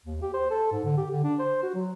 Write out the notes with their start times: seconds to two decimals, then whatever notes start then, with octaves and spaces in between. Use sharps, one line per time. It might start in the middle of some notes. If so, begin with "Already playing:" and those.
0.06 D#2
0.22 G4
0.34 C5
0.50 A4
0.72 G#2
0.84 D3
0.97 G4
1.10 D3
1.24 D4
1.39 C5
1.62 F#4
1.74 F#3